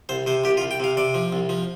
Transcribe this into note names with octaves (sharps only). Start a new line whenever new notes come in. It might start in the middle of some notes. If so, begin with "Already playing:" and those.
C2 C5
C3 C5
C2 G4
F4
C2
G5
C3 F5
C3 D5
F3
C2
F3